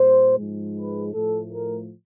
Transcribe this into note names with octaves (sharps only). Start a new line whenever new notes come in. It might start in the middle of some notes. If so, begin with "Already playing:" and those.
Already playing: A#2 G3 C5
G#2 F3 G#3
B4
A2 F3 A3 A4
A#4